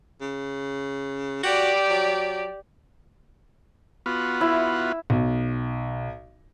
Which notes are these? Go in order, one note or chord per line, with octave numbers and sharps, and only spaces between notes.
C#3
F#4 G4 D5
F#3
B3 F4 F#4
E4
B1